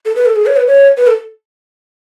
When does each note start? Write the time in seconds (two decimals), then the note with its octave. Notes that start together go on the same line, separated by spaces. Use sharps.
0.05 A4
0.16 B4
0.26 A4
0.36 G#4
0.46 C#5
0.56 B4
0.67 C#5
0.97 B4
1.07 A4